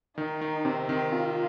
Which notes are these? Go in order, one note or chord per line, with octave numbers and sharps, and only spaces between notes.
D#3 D#4
D#3
C3 C4
D#3
F4